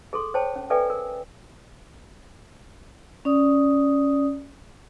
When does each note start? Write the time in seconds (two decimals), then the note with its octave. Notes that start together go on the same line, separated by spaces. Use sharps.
0.13 G#4 A4 C6
0.34 C5 C#5 G5 A5
0.56 C#4
0.70 A4 B4 D5 E5 G5 G#5
0.90 A#4
3.25 C#4 D5 D#6